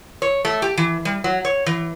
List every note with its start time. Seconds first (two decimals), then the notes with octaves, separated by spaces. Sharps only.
0.22 C#5
0.45 A3
0.62 G4
0.77 E3
1.05 G3
1.24 F#3
1.45 C#5
1.66 E3